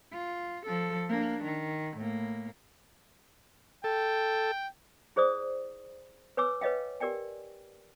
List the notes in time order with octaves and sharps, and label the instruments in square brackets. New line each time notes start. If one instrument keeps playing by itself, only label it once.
[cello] F4
F3 A4
A#3 D4
D#3
A2 A#3
[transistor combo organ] A4 [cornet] G5
[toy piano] E4 G#4 C5 D5 D#6
B4 C#5 G#5 D6 E6
B4 C#5 D#5 F5 G5
G4 A#4 D5 G5 G#5